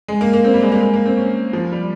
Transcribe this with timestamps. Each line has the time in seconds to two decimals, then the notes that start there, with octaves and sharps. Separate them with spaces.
0.08 G#3
0.21 A#3
0.33 A#3
0.44 C4
0.54 G3
0.62 G#3
0.72 A#3
0.81 G#3
0.93 A#3
1.06 C4
1.17 C#4
1.53 F3
1.72 G3